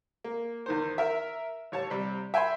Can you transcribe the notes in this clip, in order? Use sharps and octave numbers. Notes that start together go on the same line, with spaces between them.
A#3
E2 D#3 C5
A#4 E5
A1 C#5 A5
C3 G3
E5 G5 G#5 B5 C6